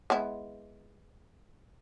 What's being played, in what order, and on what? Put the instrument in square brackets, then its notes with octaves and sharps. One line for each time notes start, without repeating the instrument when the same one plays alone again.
[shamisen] G#3 B3 E4